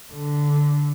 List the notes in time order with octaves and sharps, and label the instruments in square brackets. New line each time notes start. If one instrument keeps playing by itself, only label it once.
[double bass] D3